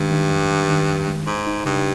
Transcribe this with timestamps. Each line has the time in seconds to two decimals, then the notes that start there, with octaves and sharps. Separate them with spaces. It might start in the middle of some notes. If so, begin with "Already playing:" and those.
Already playing: G2 D#3 G#3
0.12 D#3
0.30 F2
0.50 D#3
0.69 D#3
0.88 F2
1.07 G#3
1.27 G#2 D#4
1.47 D#4
1.65 G2 C#3